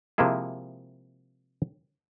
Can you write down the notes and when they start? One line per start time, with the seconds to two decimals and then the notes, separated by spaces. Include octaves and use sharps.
0.18 C3 F3 G#3 A#3 E4 G#4